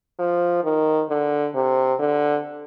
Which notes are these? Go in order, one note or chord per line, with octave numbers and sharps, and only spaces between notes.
F3
D#3
D3
C3
D3